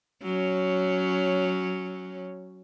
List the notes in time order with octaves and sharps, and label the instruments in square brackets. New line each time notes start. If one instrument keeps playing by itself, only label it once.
[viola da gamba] F#3 C#4